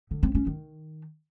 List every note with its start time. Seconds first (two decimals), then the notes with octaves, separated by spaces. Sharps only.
0.11 D3
0.23 C4
0.35 C#4
0.47 D#3